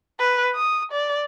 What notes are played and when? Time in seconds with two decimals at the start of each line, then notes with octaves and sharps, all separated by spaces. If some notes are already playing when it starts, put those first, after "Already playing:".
0.19 B4
0.56 D#6
0.92 D5